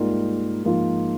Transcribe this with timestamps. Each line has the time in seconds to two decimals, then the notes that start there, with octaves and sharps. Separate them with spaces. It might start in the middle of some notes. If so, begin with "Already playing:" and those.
Already playing: G#2 G3 A#3 F4 A#4
0.64 G#2 F3 A#3 F4